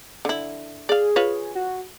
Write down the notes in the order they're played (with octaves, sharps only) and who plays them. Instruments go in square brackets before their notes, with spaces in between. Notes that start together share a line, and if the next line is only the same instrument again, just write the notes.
[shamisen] D3 E4
[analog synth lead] G#4 [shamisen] D5 F5
[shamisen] F4 B4 C#5
[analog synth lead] F#4